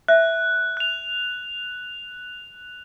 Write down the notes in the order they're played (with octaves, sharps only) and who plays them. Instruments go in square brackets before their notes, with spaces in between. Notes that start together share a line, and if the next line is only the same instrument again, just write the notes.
[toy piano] E5 [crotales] F#6
[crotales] F#6 F7